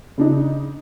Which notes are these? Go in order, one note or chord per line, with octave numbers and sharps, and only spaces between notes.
C#3 D4 D#4